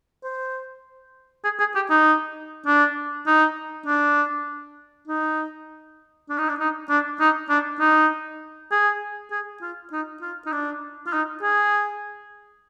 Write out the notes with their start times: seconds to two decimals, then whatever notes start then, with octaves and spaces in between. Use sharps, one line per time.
0.23 C5
1.44 G#4
1.59 G#4
1.75 G4
1.90 D#4
2.66 D4
3.26 D#4
3.86 D4
5.07 D#4
6.29 D4
6.38 D#4
6.49 D4
6.59 D#4
6.90 D4
7.20 D#4
7.49 D4
7.80 D#4
8.71 G#4
9.31 G#4
9.62 F4
9.92 D#4
10.21 F4
10.46 D#4
10.52 D4
11.07 F4
11.13 D#4
11.42 G#4